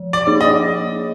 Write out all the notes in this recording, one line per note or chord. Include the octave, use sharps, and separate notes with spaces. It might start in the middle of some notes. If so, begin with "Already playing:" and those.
Already playing: F3
D5
A#3 D#4 G#4 C#5
D#5